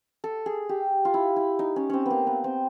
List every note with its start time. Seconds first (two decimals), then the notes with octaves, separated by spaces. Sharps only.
0.24 A4
0.46 G#4
0.69 G4
1.05 F4
1.14 E4
1.36 E4
1.59 D#4
1.76 C#4
1.90 C4 C#4
2.06 A#3 B3
2.27 B3
2.44 C4